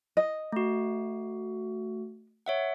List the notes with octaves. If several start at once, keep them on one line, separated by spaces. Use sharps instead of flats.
D#5
A3 F#4
C#5 E5 F#5